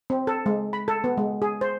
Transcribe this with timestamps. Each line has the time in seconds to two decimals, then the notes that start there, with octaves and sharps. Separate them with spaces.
0.10 C4
0.27 A4
0.46 G#3
0.73 B5
0.88 A4
1.04 B3
1.17 G#3
1.42 G#4
1.61 C5